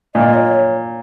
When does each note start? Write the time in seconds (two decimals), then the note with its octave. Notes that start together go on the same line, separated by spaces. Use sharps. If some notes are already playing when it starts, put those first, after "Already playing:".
0.15 A#2 D#5
0.34 C#5